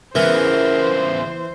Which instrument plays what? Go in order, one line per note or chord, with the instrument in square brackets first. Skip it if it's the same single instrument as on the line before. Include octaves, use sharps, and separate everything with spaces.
[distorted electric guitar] C#3 B3 [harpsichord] E3 [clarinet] A#4 [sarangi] C5